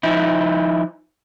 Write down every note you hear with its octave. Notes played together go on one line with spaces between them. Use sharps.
F3 D#4 E4